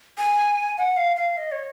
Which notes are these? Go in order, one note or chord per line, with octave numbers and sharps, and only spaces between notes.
G#5
F#5
F5
F5
D#5
C#5